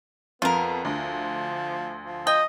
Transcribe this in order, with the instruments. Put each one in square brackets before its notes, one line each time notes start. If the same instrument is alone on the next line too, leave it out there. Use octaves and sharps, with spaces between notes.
[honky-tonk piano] F2 [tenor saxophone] B3 [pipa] F4 A#4
[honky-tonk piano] D2 [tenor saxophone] F3
[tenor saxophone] F3
[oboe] D#5 [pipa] G5